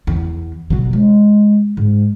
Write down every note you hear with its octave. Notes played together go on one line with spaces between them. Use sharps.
E2
B2 F#3
G#3
G#2